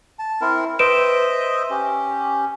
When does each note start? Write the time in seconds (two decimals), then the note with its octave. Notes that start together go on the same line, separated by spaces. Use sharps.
0.19 A5
0.41 C4 E4 A#4
0.79 B4 C5 D#5 E5 D7 E7
1.70 C#4 G4